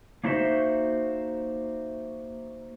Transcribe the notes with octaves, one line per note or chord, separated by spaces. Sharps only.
A#3 D4 D#4 F#4 C5 E5